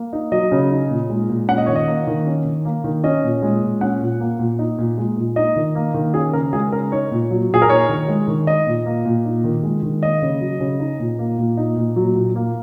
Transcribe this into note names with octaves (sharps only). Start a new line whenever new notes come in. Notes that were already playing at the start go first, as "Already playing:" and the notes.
Already playing: A#3
D#4
F#3 D#5
C#3
D#4
A#2
G#3
A#2
C#4 F#5
D#5
D#3 C#5
D#5
A#3
D#3
C#4
D#3
A#3
D#3
C#4 D#5
A#2
G#3
A#2
C#4 F#5
A#2
A#3
A#2
D#4
A#2
G#3
A#2
D#4 D#5
D#3
A#3
D#3
C#4 G#4
C#3 A#4
G#3 G#4
C#3 A#4
D#4 C#5
A#2
F#3
A#2 G#4
A#4
D#4 C#5
D#3
G#3
D#3
D#4 D#5
A#2
A#3
A#2
D#4
D#3
G#3
D#3
A#3 D#5
C#3
F#3
C#3
D#4
A#2
A#3
A#2
D#4
A#2
F#3
A#2
A#3